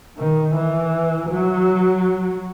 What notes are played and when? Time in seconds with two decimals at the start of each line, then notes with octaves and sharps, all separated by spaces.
0.18 D#3
0.55 E3
1.30 F#3